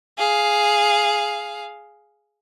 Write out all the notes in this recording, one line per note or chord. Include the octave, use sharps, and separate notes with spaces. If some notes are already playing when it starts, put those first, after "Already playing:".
G#4 F5